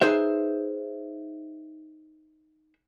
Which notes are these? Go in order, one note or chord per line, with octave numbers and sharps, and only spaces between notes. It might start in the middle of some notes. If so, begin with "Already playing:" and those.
D#4 G#4 B4 C5 E5